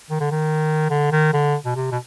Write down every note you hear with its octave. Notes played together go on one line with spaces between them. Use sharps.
D#3
D3
D#3
D3
D#3
D3
B2
C3
B2